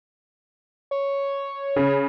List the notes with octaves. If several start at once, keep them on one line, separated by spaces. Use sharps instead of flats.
C#5
C#3